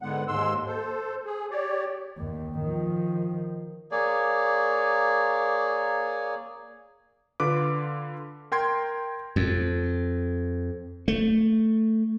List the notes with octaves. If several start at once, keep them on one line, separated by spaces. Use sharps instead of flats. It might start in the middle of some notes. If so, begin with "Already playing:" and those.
G#2 D3 G#3 B3 F#5
D#2 G#2 G#3 C6 E6
A4 C5
G#4
G4 C#5 D5
D#2
D#3 F3
A#3 G#4 C#5 D5
D3 F4 B4 D6
A#4 G5 C6 G#6
F2
A3